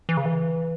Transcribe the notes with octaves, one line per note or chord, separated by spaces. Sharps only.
E3
C#3
E3